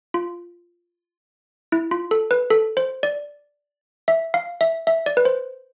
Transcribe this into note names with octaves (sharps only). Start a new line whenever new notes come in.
F4
E4
F4
A4
B4
A4
C5
D5
E5
F5
E5
E5
D5
B4
C5